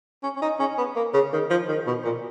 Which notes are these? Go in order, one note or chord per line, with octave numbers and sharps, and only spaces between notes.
C#4
C#4
D#4
C#4
B3
A#3
C#3
D#3
F3
D#3
B2
A#2